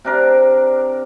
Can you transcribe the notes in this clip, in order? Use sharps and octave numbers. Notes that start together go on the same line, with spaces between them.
C3 D4 A#4